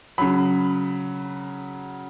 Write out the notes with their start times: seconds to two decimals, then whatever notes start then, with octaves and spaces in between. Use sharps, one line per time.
0.18 C#3 F#3 B5